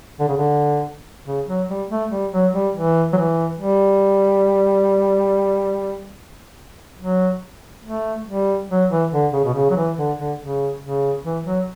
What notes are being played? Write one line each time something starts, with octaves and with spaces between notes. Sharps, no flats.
D3
C#3
D3
C#3
F#3
G3
A3
G3
F#3
G3
E3
F#3
E3
G3
F#3
A3
G3
F#3
E3
D3
C#3
B2
C#3
F#3
E3
D3
D3
C#3
C#3
E3
F#3